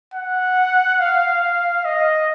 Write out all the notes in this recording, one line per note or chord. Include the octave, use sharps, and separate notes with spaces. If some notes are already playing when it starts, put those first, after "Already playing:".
F#5
F5
D#5